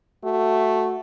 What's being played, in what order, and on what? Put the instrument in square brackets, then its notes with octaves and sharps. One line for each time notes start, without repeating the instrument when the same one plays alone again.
[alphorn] A3 [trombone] F#4